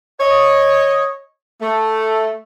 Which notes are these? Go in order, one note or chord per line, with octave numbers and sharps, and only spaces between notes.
C#5 D#5
A3